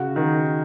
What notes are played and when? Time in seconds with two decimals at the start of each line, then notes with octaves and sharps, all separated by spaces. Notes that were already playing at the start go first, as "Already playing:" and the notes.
Already playing: C#3 F#4
0.16 D#3